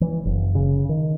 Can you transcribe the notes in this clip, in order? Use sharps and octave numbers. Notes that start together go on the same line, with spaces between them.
E3
F#1
C#3
D#3